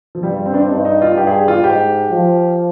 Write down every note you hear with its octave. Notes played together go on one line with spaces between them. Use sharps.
F3
G2 G3
C4
D4
C4
G2 D#4
D#4
F4
G2 G4
G#4
G4
F4
G#2 G4
F3